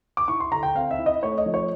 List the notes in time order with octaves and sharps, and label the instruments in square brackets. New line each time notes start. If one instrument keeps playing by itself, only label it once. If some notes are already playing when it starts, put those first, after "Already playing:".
[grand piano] D6
E4 C#6
C6
D3 A#5
G5
C4 F5
E5
E4
D#5
A3 C#5
D#5
F3
C#5